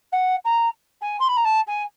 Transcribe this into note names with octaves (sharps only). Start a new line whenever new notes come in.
F#5
A#5
G#5
C6
B5
A#5
A5
G#5